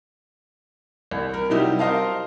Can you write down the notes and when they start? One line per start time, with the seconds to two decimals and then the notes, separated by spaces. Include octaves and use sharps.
1.11 C2
1.34 A#4
1.50 C3 F#3 G3 D#4 E4 G4
1.79 A#4 C5 D#5 F5 A5